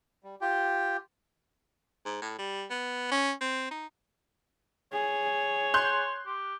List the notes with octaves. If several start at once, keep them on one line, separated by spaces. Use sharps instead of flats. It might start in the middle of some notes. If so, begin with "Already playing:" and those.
G3
F4 G4 G5
G#2
A2
G3
B3
C#4
C4
D#4
G#4 C#5
C6 F#6 G6
G4